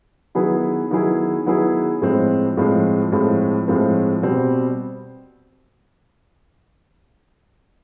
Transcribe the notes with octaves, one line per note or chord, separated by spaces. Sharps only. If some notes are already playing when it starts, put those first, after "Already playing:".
D#3 F#3 B3 E4 G#4
D#3 F#3 B3 E4 G#4
D#3 F#3 B3 E4 G#4
A2 F3 G#3 C4
A2 F3 G#3 C4
A2 F3 G#3 C4
A2 F3 G#3 C4
B2 G3 C4